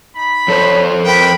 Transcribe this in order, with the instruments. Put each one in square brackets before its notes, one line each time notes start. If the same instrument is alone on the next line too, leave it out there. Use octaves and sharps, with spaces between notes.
[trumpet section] D#4 B5
[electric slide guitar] F2 A4 C5 [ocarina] C#5
[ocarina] A#4 [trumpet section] B4 F5 [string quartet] G5 B5